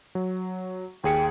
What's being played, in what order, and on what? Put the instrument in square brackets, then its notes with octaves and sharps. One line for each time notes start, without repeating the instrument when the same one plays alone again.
[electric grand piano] F#3
[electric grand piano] D#2 G#4 C#7 [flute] G5